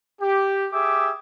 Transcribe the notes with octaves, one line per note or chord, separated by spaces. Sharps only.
G4
G4 G#4 E5 D6